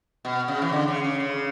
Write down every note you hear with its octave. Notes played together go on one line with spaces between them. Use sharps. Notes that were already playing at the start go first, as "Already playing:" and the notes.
B2
C#3
E3
D3
C#3
C#3
C#3